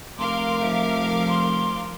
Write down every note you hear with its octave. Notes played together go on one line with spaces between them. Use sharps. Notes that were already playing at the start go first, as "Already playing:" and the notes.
F1 A#4 F5 C6 D6
F3 E5
C6